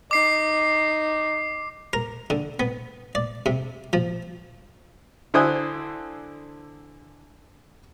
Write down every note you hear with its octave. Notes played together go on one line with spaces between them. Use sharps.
D#4 D6 C7
A#4
D3
B3
D5
C3
F3
D3 E4 C5 G#5 D#6 F#6